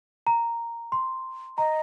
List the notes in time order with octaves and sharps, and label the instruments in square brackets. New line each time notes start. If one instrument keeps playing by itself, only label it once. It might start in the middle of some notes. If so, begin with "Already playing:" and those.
[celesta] A#5
C6
[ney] D#5 [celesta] A#5